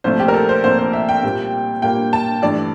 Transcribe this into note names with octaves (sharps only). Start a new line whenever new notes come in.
C2 A#2 F3 A3 C5
G4
A#4
A4
C5
C2 A#2 F3 A3 C5
C5
E5
G5
A#2 G3 A#3
A#2 G3 A#3 G5
A5
G2 E3 A3 D5